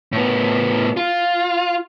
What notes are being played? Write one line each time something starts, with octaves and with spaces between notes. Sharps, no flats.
A2 B3
F4